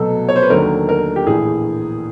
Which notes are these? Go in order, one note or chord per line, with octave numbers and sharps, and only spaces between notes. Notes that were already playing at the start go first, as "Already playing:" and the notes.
Already playing: C2 B2 F#3 A3 A4
C#5
C5
B4
D#2 D3 F#3 A3 A#4
A#4
G4
A#1 A2 E3 G#4